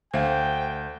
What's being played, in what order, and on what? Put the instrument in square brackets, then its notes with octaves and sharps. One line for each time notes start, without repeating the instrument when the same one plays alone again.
[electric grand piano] D2 [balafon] C5 E5 F5 [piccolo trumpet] G5